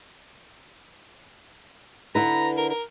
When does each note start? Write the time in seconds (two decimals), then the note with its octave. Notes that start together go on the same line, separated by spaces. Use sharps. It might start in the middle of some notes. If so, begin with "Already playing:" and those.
2.15 D3 E4 B4 A#5
2.57 A#4
2.70 A#4